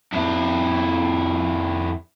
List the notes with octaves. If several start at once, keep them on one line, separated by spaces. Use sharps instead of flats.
F2 E4